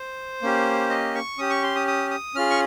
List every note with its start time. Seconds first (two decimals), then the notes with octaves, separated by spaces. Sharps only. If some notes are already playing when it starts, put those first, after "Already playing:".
Already playing: C5
0.42 A#3 C#4 G4
0.90 D#5
1.15 C#6
1.38 C#4 G4 D#6
1.50 C#6
1.63 C6
1.75 D#6
1.88 D#6
2.11 D#6
2.35 C#4 F4 G#4 F6
2.50 C#6